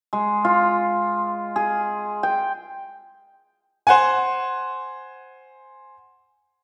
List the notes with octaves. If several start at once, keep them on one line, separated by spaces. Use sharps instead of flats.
G#3
F4
G#4
G5
C5 F#5 G#5